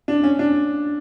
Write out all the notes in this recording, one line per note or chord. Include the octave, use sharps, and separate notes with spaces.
D4
C#4
D4